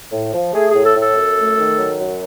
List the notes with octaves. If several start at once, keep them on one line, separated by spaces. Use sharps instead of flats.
A2
F3
A3 G#4
A2 G#4
A4
A2
A4
F#2
A3
D#3
F#3
F#2